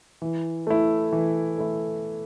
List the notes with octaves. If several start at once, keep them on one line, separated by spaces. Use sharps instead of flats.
E3
A3 E4
E3
A3 E4